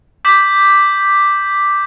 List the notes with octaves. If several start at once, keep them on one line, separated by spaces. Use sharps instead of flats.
D6 G6 B6 F#7